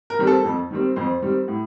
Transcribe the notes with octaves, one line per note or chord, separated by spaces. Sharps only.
A#4
D#3 G3 C4
A4
F2
D#3 G3 C4
F2 C5
D#3 G3 C4
A2